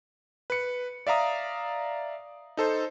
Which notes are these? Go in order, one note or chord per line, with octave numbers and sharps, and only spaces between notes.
B4 C#7
D5 E5 F5 A#5 D#6
D#4 A4 C5